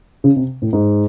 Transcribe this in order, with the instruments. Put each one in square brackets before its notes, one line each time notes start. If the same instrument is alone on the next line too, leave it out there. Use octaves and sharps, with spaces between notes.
[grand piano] C#3
C3
A2
G#2